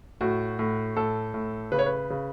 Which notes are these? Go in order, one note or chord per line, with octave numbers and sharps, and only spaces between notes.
A2 F#4
A2
A2 A4
A2
C#3 B4
C#5
B4
C#3